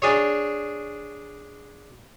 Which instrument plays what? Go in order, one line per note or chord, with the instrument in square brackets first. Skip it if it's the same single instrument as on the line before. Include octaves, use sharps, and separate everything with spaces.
[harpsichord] D4 G#4 C#5